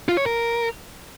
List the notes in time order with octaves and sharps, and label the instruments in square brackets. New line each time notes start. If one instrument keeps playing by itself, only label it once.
[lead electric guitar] F4
C#5
A#4